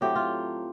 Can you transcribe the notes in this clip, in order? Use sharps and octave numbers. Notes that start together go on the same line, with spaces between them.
A2 F#3 A3 C4 G4
F4